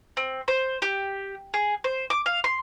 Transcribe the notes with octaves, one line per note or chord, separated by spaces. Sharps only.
C4
C5
G4
G#4
C5
D6
F5
C6